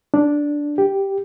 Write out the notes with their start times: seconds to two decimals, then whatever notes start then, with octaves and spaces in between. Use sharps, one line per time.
0.14 D4
0.78 G4